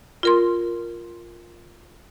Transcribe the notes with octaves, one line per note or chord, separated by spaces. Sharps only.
F4 A#4 C6